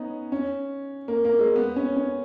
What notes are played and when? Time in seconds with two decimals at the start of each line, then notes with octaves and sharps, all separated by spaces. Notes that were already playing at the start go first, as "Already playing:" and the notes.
Already playing: B3 C#4 D#4
0.32 C#4
1.08 A#3
1.25 A#3
1.39 G#3
1.55 B3
1.76 C#4
1.96 C#4